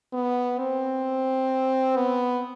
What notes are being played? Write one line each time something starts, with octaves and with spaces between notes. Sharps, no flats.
B3
C4
B3